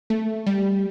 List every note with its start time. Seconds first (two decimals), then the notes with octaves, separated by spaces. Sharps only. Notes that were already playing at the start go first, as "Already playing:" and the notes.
0.10 A3
0.46 G3